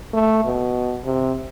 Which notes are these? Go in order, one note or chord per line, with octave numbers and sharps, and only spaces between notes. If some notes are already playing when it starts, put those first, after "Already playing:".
A3
B2
C3